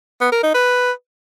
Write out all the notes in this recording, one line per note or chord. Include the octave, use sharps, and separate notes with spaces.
B3
A#4
D#4
B4